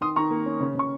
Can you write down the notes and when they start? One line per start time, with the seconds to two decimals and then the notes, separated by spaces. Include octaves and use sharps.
0.01 D#3 C6 D#6
0.16 D#3 A#5 C#6
0.31 A#3
0.46 C#4
0.60 C#3
0.75 C#3 C#6